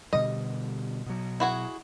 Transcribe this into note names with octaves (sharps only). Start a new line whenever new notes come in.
B2 D3 G3 D#5
B2 F#3
E4 F#4 G#4